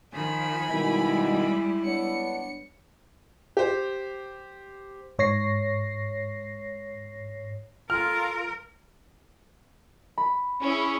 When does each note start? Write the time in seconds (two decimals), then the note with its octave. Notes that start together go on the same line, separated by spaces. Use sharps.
0.13 D#3 F3 G#5 B5
0.69 B2 D#3 G3 G#3 E4
1.85 B3 D4 C#5 C#7
3.57 G4 C5
5.19 G#2 C#5 A#6 C7
7.90 F4 A4 A#4 F6
10.18 B5
10.61 C#4 E4 G#4